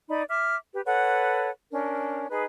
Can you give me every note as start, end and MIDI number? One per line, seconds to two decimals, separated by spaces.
0.09 0.23 63
0.09 0.23 74
0.09 0.23 83
0.29 0.56 76
0.29 0.56 86
0.29 0.56 89
0.74 0.81 67
0.74 0.81 71
0.85 1.49 69
0.85 1.49 71
0.85 1.49 73
0.85 1.49 78
1.71 2.27 61
1.71 2.27 62
1.71 2.27 70
2.30 2.44 63
2.30 2.44 68
2.30 2.44 71